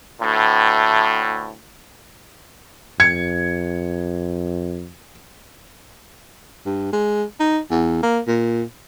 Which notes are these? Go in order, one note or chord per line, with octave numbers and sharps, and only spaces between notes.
D2 A2
F2 G#6 C#7
G2
G#3
D#4
E2
A#3
A#2